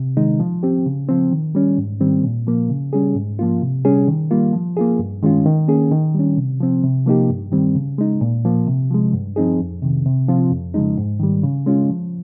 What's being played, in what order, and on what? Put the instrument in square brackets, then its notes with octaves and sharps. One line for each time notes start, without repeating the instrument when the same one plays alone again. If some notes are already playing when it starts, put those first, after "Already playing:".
Already playing: [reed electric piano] C3
D#3 G#3 D#4
F3
C4 G4
C#3
F3 C4
D#3
G3 C#4
G#2
D#3 G3 C4
A#2
F3 A#3
C#3
G3 C#4 G#4
G#2
F3 A#3 F4
C3
G3 C#4 G#4
D#3
G3 A#3 F4
F3
A#3 F4 G#4
G2
D#3 G#3 C#4 F4
D#3
A#3 C#4 G#4
D#3
G3 C#4
C3
F3 C4
C3
F3 A#3 D#4 G4
G2
D#3 G3 C4
C#3
G#3 D#4
A#2
F3 A#3
C3
F3 G#3
G2
F3 C4 D#4 G#4
F2
C3 D#3
C3
F3 C4 F4
F2
C#3 F3 G#3 D#4
G#2
D#3 G3
C#3
G#3 C#4 F4
F3